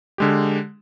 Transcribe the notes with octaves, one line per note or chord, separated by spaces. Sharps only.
D3 G#3 G4